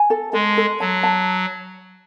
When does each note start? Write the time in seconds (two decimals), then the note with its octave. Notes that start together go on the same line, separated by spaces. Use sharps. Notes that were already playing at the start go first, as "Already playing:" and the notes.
Already playing: G#5
0.10 A4
0.33 G#3 A4
0.57 A4
0.80 F#3 A5
1.03 A5